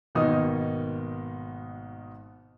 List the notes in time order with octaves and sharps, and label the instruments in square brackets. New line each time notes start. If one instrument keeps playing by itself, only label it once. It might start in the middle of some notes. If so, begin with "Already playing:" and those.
[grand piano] G#1 B2 D#3 A#3 D#4 D#6